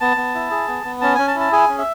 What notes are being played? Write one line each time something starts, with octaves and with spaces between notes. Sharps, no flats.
B3 A5
B3
E4
G#4
B3
B3
C#4 A5
C#4 G#5
A5
E4
A5
G#4 G#5
C#4
E5